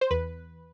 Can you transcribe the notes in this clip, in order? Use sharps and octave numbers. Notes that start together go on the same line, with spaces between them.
C5
E2 B4